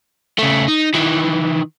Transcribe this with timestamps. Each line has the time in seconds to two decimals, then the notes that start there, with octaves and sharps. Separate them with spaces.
0.39 C#3 A3
0.68 D#4
0.95 D#3 E3